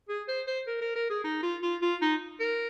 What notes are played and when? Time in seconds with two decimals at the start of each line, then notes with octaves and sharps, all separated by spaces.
0.09 G#4
0.28 C5
0.47 C5
0.67 A#4
0.81 A#4
0.95 A#4
1.10 G#4
1.24 D#4
1.43 F4
1.63 F4
1.82 F4
2.02 D#4
2.40 A#4